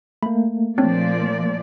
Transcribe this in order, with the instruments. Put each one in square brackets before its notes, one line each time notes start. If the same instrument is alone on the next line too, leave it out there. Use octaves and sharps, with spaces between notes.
[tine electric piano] A3 A#3 [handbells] B5
[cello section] A#2 F3 D5 [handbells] C4 D4 C#5